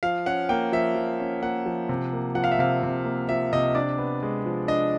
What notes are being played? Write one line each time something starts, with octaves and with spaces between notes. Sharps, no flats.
F3 F5
C#4 F#5
A#3 G5
F3 E5
F3
C#4
A#3 F#5
F3
C3
A#3
F3 F#5
F5
E5
C3 F5
C3
A#3
F3 E5
C3 D#5
D4 D5
B3
G#3
F3
D4 D#5